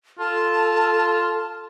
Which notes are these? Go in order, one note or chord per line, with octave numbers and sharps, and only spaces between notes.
F4 A4 A5